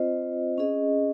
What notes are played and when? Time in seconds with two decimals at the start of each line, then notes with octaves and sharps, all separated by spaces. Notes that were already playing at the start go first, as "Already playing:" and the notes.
Already playing: C4 F4 C5 D#5
0.58 C#4 G#4 D#5